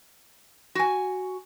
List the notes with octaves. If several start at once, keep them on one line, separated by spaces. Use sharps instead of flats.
F#4 G#5